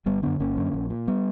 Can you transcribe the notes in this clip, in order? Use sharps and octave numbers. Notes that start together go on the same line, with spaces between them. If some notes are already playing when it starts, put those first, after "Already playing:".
G1 G3 B3
F#2 D3 B3 D4
G1 A#3 C#4
F#2 D3
A#1
A#2
G3 B3